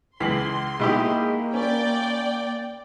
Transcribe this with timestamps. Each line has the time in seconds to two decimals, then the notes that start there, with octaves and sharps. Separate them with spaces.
0.20 C#2 E3 C6 B6 C7 F#7
0.80 B2 G#3 A#3 D#4 E4 G4
1.53 C#4 D5 G5